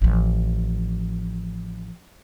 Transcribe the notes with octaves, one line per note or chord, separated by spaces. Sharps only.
A1 F3